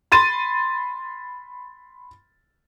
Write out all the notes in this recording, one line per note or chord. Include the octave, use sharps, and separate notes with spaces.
B5 C6 A6 D#7